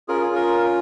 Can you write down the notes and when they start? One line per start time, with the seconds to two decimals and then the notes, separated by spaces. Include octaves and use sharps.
0.08 C#4 F4 G#4 A#4
0.22 G#4
0.35 A#4